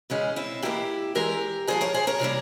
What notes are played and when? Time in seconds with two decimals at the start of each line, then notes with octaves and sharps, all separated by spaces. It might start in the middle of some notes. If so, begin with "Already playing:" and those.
0.10 E2 C#3 E3 G#3 C#4
0.36 C4 E4
0.62 G#2 E3 A#3 E4 G4
1.15 E2 E3 G#3 G4 A#4
1.67 G2 F3 A#3 G#4 C5
1.81 A#4 C#5
1.94 G#4 C5
2.07 A#4 C#5
2.20 C3 E3 G3 A#3